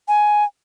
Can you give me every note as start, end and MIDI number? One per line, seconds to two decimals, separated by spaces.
0.08 0.44 80